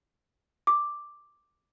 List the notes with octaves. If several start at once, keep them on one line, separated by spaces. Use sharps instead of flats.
D6